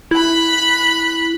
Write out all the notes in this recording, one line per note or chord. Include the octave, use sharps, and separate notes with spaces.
E4 B5 F#6